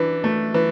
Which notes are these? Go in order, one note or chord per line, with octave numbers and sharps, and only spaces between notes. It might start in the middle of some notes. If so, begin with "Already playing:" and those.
Already playing: E3 D4
A3
E3